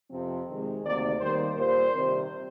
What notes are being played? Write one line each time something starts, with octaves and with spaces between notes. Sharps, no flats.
F2 C3 F3 C4
C3 D#3 G#3
D2 C3 D#3 A#3 D5
D#2 D#3 G3 A#3 C5
A#2 G3 A#3 C5
C3 D#3 G3 C4